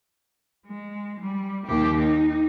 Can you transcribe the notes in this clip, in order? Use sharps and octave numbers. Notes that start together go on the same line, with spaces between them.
G#3
G3
D#2 G4
D#4